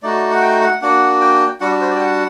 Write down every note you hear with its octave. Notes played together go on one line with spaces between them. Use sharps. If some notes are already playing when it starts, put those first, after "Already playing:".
A3 D#4 F#4 D5
F#5
G5
F#5
A#3 D4 F#4 F#5
G5
G3 D4 F#4 F#5
D5
C5
D5
G5
F#5